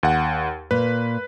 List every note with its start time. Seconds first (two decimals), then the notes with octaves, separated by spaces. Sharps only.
0.03 D#2 F#5
0.71 A#2 B4